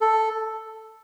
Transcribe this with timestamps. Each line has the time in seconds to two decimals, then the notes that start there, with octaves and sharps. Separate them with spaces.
0.01 A4